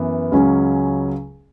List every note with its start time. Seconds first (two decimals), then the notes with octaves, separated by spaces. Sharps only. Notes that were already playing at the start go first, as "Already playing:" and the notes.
Already playing: F#2 E3 B3
0.32 C#2 C#3 F#3 C#4